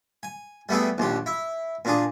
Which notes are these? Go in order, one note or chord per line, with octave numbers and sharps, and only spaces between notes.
G#5
G3 A3 B3 E4 G#4
A#1 D#2 G4
E4
A#2 D4 G#4